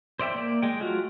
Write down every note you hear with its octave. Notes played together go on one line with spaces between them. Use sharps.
C5 D5 E5 G5
A#3 D5
G#3 G5
F#3 A3 F4 F#4